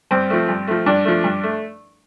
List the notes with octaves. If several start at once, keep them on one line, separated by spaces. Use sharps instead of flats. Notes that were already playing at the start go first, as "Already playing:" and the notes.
G2 C4
F3 A3
G2
F3 A3
G2 D4
F3 A3
G2
A3